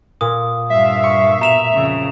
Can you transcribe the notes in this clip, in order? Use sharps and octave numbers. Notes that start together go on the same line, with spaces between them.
A#2 D#6
G2 E5 F5
C#6
B2 A#5 E7 F7
F2 C#3